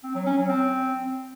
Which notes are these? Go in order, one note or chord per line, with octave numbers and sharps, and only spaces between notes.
C4
F#3
C#4
F#3
C4